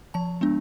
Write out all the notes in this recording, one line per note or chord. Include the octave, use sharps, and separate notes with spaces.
F3 A5
G#3 B3 D4